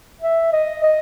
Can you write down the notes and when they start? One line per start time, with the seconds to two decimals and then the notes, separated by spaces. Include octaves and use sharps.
0.21 E5
0.52 D#5
0.84 D#5